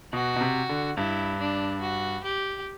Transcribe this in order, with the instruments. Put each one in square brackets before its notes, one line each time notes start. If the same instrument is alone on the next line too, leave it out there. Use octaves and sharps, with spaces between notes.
[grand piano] B2 [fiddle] F#4
[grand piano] B2
C3
D3
[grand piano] G2 [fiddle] E4
[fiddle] D4
F#4
G4